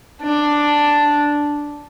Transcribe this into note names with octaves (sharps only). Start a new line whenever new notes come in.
D4